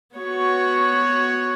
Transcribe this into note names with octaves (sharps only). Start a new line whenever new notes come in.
B3 F#4 C#5